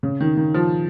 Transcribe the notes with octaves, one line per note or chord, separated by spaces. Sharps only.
C#3
D#3
D#3
F3